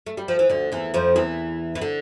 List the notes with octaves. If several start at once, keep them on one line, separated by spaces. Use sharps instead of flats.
A3
G3
F3
E3
D2 D3
E2 E3
F2 F3
E2 E3
E3
D3